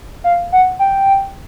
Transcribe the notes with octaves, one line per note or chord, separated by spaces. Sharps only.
F5
F#5
G5